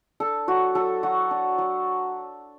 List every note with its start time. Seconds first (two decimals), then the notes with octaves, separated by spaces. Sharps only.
0.20 D4 A4
0.48 F#3 F#4
0.75 F#3 A4
1.03 F#3 F#4
1.31 D4
1.58 F#3